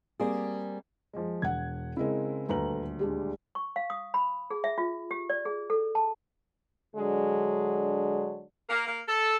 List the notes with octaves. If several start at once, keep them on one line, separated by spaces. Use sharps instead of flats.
G3 A#3 C4 G#4
F3 G#3
E1 F#5 G#6
C#3 G#3 C4 E4 A#4
D#1 D2 A4 B4 A#5 F#7
G3 G#3 D4
C#6
F5
D#6
B5
G#4
E5
F4
G4
D5
G#4
A4
A5
D3 F#3 G#3 D4
A#3
A#3
A4